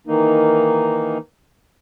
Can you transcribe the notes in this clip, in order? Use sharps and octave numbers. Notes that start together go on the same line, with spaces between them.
D#3 E3 A#3 D#4